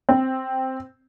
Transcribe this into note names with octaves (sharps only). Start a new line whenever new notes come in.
C4